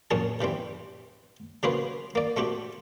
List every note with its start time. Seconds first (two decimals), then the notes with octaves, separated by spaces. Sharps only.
0.11 F2 A#2 C#4 G#4 A5
0.41 C3 E3 G3 C4
1.63 C#3 A#3 F#4 G#4 B4 C5
2.15 A#3 D5
2.37 A3 C4 F#4 G4